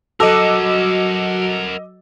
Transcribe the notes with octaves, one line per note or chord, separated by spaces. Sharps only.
F#3 F#4 A4 A#4 D#5 F#5 D6 E6